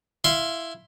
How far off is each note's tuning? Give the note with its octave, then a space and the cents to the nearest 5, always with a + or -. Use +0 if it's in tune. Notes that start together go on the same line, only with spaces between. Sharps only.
E4 +5 F5 +0 C6 +5